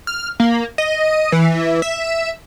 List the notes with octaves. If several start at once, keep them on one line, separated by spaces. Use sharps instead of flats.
F6
A#3
D#5
E3
E5